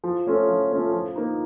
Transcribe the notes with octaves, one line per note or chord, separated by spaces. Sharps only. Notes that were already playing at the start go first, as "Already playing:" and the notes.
F3
A3 C#4 F4 A4
F3
A3 C#4 F4 A4
F3
A#3 D#4